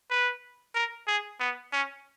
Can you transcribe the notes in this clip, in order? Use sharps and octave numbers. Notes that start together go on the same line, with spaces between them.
B4
A#4
G#4
B3
C#4